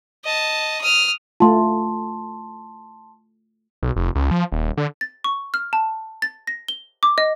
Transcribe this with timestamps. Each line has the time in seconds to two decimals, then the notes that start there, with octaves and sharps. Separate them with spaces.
0.25 D#5 A5
0.81 D#6 F6
1.40 A3 F4 A5 C6
3.83 B1
3.96 F1
4.15 C#2
4.31 F3
4.52 D#1
4.77 D3
5.01 A6
5.24 C#6
5.54 F6
5.73 A5
6.22 A6
6.47 A#6
6.68 G7
7.03 D6
7.18 D#5